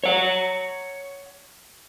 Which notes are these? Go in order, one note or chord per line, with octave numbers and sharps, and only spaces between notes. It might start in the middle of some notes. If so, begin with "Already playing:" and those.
C#5 F#5